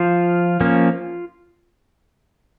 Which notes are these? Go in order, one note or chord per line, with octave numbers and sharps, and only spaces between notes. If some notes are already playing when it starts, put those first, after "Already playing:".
Already playing: F3 F4
F3 A#3 C#4